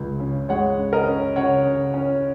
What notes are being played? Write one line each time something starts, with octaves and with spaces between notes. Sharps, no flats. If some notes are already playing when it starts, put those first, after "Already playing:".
Already playing: C#2 G#3
C#3
G#3 C#5 F#5
C#3
A#4 D#5
C#4
C#3 C#5 F#5
C#3
C#4